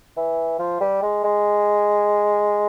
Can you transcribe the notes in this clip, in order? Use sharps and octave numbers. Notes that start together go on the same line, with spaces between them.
E3
F3
G3
G#3
G#3